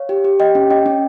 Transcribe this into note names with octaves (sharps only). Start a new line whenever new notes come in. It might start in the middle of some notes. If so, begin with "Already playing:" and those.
Already playing: C#5 F5
G4
G4
G4 D#5 G5
C#4
C#4 D#5 G5
C#4